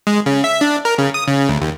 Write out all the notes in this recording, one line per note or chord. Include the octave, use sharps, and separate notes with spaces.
G#3
C#3
E5
D4
A#4
C#3
D#6
C#3
D2
D#2